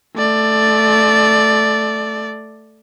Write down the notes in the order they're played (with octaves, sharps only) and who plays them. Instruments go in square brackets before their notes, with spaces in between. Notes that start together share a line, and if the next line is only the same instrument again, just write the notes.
[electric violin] A3 D5